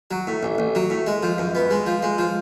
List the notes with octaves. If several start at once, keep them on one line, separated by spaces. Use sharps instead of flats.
F#3
A2
A1
A1
F#3
A2
G#3
F3
F#2
B3
G#3
F3
G#3
F3